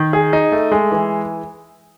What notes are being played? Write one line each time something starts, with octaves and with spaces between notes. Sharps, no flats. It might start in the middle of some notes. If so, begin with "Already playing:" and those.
Already playing: D#3
G#4
D#4
A3
G#3
E3